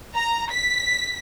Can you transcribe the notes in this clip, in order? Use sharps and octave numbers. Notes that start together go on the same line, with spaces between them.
A#5
B6